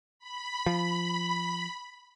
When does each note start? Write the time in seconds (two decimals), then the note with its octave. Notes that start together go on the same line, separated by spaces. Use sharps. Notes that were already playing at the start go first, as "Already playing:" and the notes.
0.19 B5
0.66 F3